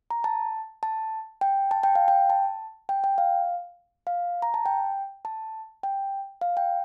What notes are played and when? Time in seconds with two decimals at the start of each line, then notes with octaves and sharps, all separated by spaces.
0.10 A#5
0.24 A5
0.83 A5
1.41 G5
1.71 A5
1.83 G5
1.95 F5
2.08 G5
2.30 A5
2.89 G5
3.04 G5
3.18 F5
4.07 F5
4.42 A#5
4.54 A5
4.66 G5
5.25 A5
5.83 G5
6.41 F5
6.57 G5